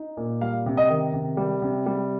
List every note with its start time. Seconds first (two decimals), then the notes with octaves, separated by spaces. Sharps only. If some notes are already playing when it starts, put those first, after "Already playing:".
Already playing: D#4
0.17 A#2
0.41 G3 F5
0.66 C3
0.77 D#5
0.90 D#3
1.13 C3
1.37 G3
1.62 C3
1.86 G3